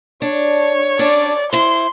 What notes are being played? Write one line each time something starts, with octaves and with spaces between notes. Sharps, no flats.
D4 C#5
C#4 D4 D5
E4 C5 C6